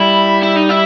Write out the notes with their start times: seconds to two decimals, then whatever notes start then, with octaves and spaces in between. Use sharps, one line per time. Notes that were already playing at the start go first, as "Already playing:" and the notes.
Already playing: G3 E4
0.43 E4
0.56 D#4
0.69 E4